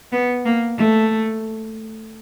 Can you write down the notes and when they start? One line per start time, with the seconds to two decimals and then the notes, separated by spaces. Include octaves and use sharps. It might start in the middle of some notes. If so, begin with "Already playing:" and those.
0.12 B3
0.45 A#3
0.77 A3